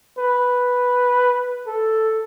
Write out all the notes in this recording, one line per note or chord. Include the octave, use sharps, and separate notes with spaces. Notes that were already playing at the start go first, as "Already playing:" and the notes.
B4
A4